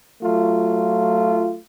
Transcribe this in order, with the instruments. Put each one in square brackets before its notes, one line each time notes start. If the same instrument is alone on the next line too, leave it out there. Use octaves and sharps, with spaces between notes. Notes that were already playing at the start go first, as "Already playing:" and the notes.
[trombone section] F#3 A3 F4